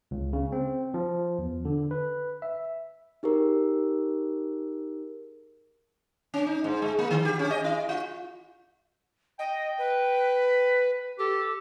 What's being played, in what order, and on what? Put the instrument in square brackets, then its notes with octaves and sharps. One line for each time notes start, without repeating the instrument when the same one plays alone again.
[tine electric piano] C#2
C#3
C4
F3
E2
D3
B4
E5
[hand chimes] D#4 G4 G#4 A#4
[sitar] C#4
D#4
G#2
G#3
A#3
D#3
G4
C#4
D#5
E4
F4
[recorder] D#5 [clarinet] G5
[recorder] B4
[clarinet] G4 [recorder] A4